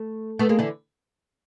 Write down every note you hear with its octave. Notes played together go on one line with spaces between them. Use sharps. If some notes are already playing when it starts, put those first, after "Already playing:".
Already playing: A3
A3 B3
G#3 A#3
D3 E3